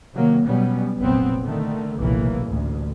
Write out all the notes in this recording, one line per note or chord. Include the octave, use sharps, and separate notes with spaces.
C3 D#3 F#3 A#3
B2 F#3 G3 B3 C#4
F1 A#1 F#3 B3 C4
D3 D#3 A3
F1 B1 A#2 E3 A#3
A1 D2